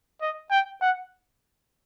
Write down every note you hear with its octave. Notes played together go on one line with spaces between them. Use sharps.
D#5
G5
F#5